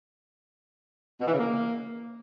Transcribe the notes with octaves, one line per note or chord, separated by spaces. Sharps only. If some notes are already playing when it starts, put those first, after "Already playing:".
B2
E3
C#3
A#3